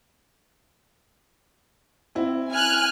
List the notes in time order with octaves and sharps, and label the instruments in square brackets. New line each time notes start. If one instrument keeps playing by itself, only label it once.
[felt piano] C4 E4
[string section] G#5 F6 F#6